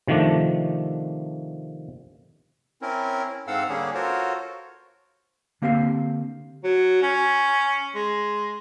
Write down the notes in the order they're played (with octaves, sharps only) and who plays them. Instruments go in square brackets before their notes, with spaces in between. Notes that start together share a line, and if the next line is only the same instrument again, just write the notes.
[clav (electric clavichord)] C3 D#3 F3 A3 D4
[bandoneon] C4 C#4 E4 A#4
G#2 C4 A4 F5 F#5 E6
D3 G3 A#3 C#4 D4 G#4
F4 F#4 A4 A#4 C5 C#5
[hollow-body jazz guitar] D3 A#3 C4 G4 F5
[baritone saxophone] F#3
C#4
G#3